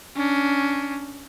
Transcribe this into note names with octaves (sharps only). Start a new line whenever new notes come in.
C#4 D4